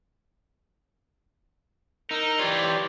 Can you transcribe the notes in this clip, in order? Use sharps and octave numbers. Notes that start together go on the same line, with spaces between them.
D#4 A#4 E6
E3 F4 G4 C#5 D5